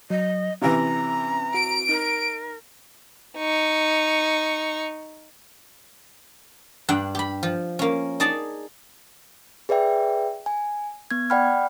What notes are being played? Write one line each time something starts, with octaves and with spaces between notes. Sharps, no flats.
F#3 D#5
C3 E3 C#4 A#5
F#4 D7
D#4 A#4
D#4 C#6
G2 D4 F#5 G5
G4 B5
F3
A#3 C#4
D#4 G#4 D5 A5 A#5
G#4 B4 D5 E5 G5
G#5
B3 G#6
D5 F#5 G5 B5 F6